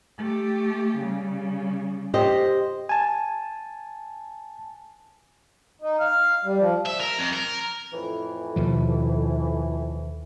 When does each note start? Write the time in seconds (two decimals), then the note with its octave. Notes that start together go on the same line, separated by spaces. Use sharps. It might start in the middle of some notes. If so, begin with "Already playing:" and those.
0.18 A3 G4
0.98 C#3 G3
2.14 G4 C5 D#5
2.89 G#5 A5
5.81 D#4
6.00 F5
6.45 G3
6.59 F3
6.86 E5
7.00 A#4
7.18 F2
7.33 A#4
7.92 F2 A2 E3
8.56 D#2 B2 F3